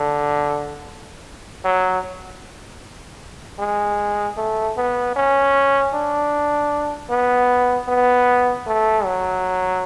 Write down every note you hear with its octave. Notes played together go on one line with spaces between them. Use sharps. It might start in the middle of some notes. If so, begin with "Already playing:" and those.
Already playing: D3
F#3
G#3
A3
B3
C#4
D4
B3
B3
A3
F#3